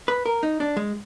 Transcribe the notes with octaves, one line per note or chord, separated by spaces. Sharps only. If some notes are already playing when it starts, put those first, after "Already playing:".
B4
A#4
D#4
D4
G#3